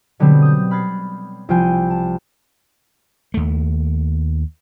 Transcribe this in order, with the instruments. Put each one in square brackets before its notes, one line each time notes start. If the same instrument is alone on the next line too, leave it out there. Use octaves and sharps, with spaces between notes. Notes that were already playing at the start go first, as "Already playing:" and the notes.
[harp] B2 D3 F#3 G3 B3 C4
D#6 G6
B5 F6 F#6 G#6 A6 C7
C2 F3 F4 G5 G#5
A5
[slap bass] D#2 A3